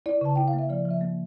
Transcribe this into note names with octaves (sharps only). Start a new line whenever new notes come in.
E4 D5
C#3 A5
E4 G5
F5
A#3
E5
F3 D5
F3
E5
A#3